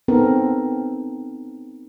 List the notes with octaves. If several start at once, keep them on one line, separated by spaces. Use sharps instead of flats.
B3 C4 D#4 A4 A#4